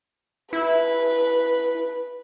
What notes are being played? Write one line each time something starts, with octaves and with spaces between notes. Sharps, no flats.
E4 B4